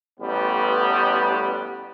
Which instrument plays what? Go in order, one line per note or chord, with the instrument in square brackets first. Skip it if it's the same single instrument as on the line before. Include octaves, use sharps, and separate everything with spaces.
[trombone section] A1 G3 B3